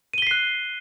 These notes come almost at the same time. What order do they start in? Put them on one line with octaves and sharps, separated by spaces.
D#7 G7 B6 C7 F#6